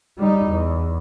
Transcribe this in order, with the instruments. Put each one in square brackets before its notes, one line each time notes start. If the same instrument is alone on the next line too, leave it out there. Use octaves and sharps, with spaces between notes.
[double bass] G3 D#4
E2